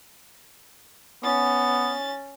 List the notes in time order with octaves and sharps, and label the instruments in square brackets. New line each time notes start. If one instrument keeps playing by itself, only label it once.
[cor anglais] B3 [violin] C#4 A6